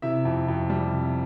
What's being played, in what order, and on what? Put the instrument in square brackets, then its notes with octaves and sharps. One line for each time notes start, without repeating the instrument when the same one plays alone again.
[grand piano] C3 E4 E5
F2
F2
G3
C3